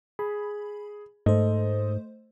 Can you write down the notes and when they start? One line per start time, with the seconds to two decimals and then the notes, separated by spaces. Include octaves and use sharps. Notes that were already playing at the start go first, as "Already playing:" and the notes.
0.19 G#4 B5
1.26 G#2 A3 A4 C5 D#5